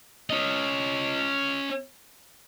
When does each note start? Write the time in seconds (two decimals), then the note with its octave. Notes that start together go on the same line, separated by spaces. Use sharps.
0.30 C#4 D#5